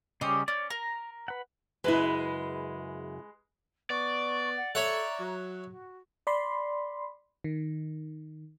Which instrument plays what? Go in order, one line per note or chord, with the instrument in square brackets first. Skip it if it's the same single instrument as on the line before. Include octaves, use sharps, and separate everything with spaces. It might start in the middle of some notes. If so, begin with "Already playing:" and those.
[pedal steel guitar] C#3 G3 C#4 [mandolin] G4 C5 D#5
[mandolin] C#4 [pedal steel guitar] D5
[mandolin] A#4 [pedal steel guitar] A#5
[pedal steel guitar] B4 F#5
[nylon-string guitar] F#2 C#3 E4 [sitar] G#3 B4
[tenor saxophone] B3 [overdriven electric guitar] D5 [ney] C#6
[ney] F#5
[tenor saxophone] A4 [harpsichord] C#5 E5 F#5 [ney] A#5
[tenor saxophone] F#3
[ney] F#4
[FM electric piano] D5 B5 C6
D#3